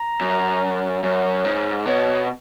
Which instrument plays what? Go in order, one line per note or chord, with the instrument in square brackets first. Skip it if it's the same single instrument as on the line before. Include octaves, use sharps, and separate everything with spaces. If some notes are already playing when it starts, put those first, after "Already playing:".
Already playing: [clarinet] A#5
[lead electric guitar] F#2
[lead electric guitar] F#2 [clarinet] C#5
[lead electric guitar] G#2
[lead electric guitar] B2 [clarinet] C#5